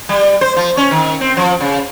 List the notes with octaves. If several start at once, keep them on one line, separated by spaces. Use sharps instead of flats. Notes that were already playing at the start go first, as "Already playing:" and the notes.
G3
C5
F3
C#4
D#3
C4
F3
C#3